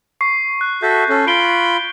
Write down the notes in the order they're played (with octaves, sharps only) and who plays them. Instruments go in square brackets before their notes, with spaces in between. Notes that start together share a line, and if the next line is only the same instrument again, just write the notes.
[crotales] C#6 C7
F#6
[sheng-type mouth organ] F#4 A4 E5 [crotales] G6
[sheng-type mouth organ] C#4 A4
[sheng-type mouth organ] F4 B5 [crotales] C7 D7 G7